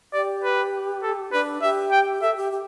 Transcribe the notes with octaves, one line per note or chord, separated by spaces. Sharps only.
G4 D5
B4
A4
D4 B4
G4 E5
G5
A4 E5
G4
G4